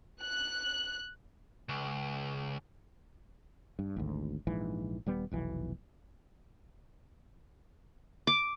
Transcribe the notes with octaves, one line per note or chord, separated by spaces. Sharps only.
F#6
C#2
G2
G#1 D2
A#1 G#2 E3
D#1 G3 B3
F1 B1 E3
D6